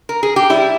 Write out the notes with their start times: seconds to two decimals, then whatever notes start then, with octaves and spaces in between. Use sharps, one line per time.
0.09 A#4
0.23 G#4
0.36 G4
0.50 G3 E4